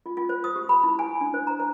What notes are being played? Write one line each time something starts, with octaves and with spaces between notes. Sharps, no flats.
F4
F4
C5
D#6
G4
B5
E4
G#5
D4
C5
A#5
C5